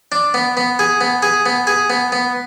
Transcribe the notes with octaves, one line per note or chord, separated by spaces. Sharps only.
D4
B3
B3
G#4
B3
G#4
B3
G#4
B3
B3